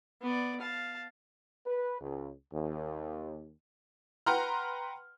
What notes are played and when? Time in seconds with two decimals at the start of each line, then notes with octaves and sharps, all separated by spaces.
0.22 B3 D5
0.60 F5 A5
1.66 B4
2.00 C#2
2.53 D#2
4.26 B4 F#5 G5 A#5 C6 F6